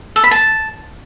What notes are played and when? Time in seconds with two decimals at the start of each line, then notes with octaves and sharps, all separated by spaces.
0.16 A4
0.24 B5
0.31 A5